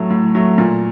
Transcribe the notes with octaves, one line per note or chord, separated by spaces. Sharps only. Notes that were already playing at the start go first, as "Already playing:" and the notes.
Already playing: A2 F#3 A3
A2
F#3 A3
A#2